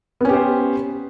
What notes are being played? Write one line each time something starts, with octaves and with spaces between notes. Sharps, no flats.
B3 C#4 G4 C5